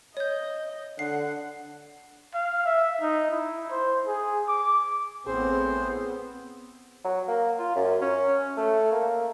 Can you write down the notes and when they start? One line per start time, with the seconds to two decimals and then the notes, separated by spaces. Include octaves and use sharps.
0.17 C#5 D#5 G6
0.99 D3 F#5 C7
2.35 F5
2.66 E5
3.01 D#4
3.31 E4
3.70 C5
4.07 G#4
4.48 D6
5.26 A1 A2 B3 C4 G#4 C5
7.05 F#3
7.28 A#3
7.59 F4
7.75 F#2
8.02 C#4
8.57 A3
8.92 A#3